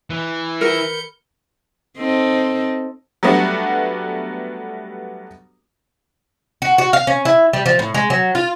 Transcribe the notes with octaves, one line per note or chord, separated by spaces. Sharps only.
E3
A#4 B4 G6 C#7
C4 D#4 A4
F#3 G3 A3 B3 D4 F#4
F#4
F#4
F5
C#4
E4
G3
F3
A2
G#3
F#3
F4